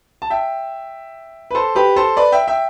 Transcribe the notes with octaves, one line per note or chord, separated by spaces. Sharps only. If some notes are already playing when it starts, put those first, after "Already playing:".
A5
E5 G5
B4
A4 C5
G4 B4
A4 C5
B4 D5
E5 G5
E5 G5